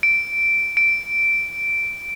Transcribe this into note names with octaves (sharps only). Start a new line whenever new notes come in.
D7
D7